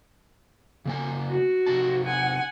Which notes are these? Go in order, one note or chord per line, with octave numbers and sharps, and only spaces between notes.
C#3 A#3 G#5
F#4
C3 D#4 A5
F#5 G#5